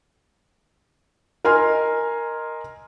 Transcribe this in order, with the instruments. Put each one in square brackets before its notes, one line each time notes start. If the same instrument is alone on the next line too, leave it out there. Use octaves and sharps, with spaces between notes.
[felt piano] A#4 D#5 G#5 C6 F6